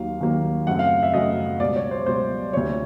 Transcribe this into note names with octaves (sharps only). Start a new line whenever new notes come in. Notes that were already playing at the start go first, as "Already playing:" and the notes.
Already playing: D#2 D#3 F#3 A#3 F5
D#2 D#3 F#3 A#3
F#2 C#3 F#3 A3 C4 F#5
F5
E5
F#2 C#3 F#3 A3 C4 D#5
C#2 B2 G3 D5
C#5
C5
C#2 B2 G3 C5
D2 C3 F3 C#5